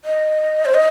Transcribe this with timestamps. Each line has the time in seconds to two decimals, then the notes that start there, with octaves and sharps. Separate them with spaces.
0.05 D#5
0.65 C5
0.74 D#5